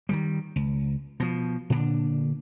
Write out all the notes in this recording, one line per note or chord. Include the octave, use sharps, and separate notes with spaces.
D#3 E3 G3
C#2
B2 F3
A#2 D3 D4